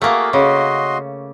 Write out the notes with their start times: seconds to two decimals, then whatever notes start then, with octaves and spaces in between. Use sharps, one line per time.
0.02 A3 A#3 F#4 G#4 A#4
0.33 C#3 F#4 D#5 C6